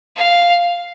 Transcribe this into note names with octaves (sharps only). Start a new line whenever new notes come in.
F5